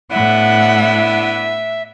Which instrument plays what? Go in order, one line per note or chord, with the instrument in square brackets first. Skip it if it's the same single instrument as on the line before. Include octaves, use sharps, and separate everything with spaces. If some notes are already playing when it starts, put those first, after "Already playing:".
[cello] A2 F#5 [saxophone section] B3 D4 E4 [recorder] E5